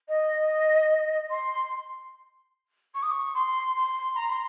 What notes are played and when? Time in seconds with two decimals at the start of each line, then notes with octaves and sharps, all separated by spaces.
0.08 D#5
1.30 C6
2.94 C#6
3.02 D#6
3.11 C#6
3.34 C6
3.75 C6
4.16 A#5
4.29 C6